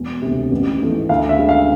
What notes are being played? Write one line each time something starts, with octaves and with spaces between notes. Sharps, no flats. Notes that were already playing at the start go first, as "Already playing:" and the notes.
Already playing: E1
D2 C3
A1
G#2 E3 A3
D2 F5
E5
D3 G#3
F5